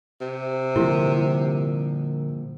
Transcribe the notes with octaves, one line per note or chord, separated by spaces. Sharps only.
C3
A#2 D3 F3 G3 E4 G4 A#4